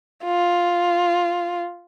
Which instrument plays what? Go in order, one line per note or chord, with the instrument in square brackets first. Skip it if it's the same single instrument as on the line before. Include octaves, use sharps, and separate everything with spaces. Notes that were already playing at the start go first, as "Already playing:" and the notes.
[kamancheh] F4